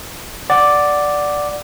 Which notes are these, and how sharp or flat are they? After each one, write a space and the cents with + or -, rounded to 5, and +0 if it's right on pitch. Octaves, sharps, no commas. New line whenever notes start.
D5 +0 F#5 +0